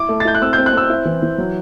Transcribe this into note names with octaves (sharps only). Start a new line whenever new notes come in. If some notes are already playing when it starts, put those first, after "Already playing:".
Already playing: E4 D6
A3
A6
E4 G6
F#6
C4 E6
G6
C4
F#6
C4 E6
E4
E3
E3
F#3